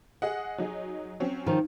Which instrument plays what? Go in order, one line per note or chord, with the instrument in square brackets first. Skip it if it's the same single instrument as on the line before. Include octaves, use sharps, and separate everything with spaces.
[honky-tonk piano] G#4 D#5 F#5
F#3 D#4 G#4
F#3 C4 C#4
[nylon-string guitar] D#3 F3